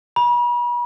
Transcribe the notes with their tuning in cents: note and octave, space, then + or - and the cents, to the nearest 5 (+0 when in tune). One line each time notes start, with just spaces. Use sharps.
B5 -40